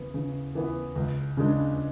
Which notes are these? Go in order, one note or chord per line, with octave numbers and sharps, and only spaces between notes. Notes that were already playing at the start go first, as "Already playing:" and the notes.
Already playing: C#3 E3 B3
C#3
E3 B3
C#2
C#3 G#3 D4